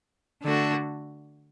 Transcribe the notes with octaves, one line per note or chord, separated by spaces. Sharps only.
D3 A3 D4 F#4